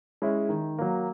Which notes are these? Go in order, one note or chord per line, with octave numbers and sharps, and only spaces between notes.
G#3 C#4 E4
D#3
F#3 A#3